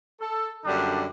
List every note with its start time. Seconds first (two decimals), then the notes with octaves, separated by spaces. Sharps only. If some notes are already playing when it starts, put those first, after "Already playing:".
0.20 A4
0.65 F#2 D3 G3 A#3 D4